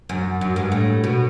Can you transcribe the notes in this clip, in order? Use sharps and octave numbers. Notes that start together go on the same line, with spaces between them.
F#2
F#2
G2
A2
B2